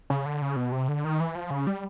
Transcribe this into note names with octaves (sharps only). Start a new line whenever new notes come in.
C#3
D3
C#3
B2
C3
D3
D#3
E3
F3
C#3
G3